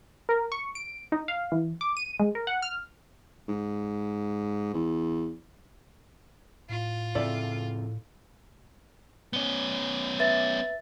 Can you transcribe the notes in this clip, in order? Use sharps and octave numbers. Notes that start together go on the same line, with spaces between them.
A#4
C#6
D7
D#4
F5
E3
D6
D#7
G#3
A#4
F#5
F6
G#2
E2
A2 F4
F2 C#3 C4 E4 A4 D5
B3 C#4 G7
B4 E5 A6